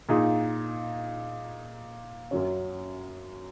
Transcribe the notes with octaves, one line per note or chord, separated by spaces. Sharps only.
A#2 A#3 D#4 G#4
F#2 F#3 C#4